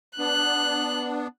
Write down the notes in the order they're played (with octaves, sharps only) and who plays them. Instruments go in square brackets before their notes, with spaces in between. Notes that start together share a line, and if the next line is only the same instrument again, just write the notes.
[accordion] B3 D4 [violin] F#6